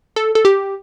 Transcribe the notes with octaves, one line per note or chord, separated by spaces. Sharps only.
A4
A4
G4